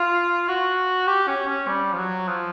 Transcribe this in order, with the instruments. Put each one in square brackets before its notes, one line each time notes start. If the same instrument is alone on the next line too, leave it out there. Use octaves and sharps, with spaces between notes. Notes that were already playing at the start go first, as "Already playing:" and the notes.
Already playing: [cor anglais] F4
F#4
G4
C#4
C#4
G3
F3
F#3
F3